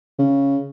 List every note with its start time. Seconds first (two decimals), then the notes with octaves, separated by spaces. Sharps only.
0.18 C#3